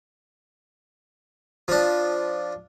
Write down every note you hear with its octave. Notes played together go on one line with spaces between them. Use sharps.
F3 D4